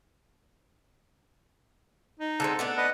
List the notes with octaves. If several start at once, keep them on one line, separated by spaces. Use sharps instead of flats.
D#4
D3 G#3 C4 A4
A3 B3 D4
B4 D5 D#5 F#5